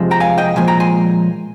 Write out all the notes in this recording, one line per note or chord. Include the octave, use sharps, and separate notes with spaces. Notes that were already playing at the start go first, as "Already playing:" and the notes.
Already playing: F2 C3 F3 G#3
G5 A#5
F5 G#5
D#5 G5
A#2 F3 G#3 G#5
G5 A#5
G#5 C6